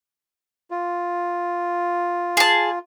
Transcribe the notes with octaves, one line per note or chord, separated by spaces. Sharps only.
F4
G#4 A5